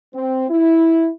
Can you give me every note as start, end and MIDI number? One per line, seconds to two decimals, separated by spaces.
0.14 0.45 60
0.50 1.09 64